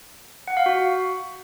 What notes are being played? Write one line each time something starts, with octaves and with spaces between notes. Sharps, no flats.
F#5
F5
F#4